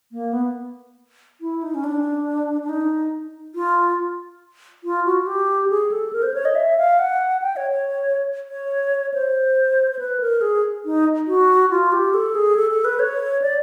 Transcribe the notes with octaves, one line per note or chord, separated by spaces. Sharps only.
A#3
B3
E4
D#4
C#4
D4
D4
D#4
F4
F4
F#4
G4
G#4
A4
A#4
C5
C#5
D#5
E5
F5
F#5
G5
C#5
C#5
C#5
C5
C5
B4
A#4
G#4
D#4
F#4
F4
G4
A4
G#4
A4
A4
B4
C#5
D5